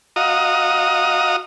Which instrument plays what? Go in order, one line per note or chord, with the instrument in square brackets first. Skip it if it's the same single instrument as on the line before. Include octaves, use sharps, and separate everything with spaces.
[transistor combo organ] F#4 D#5 F5 A#5 D#6